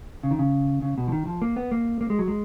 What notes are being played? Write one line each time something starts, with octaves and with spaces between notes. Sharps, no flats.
C#3
D#3
C#3
C#3
B2
F3
D#3
F3
A#3
B3
A#3
A#3
G#3
F#3
G#3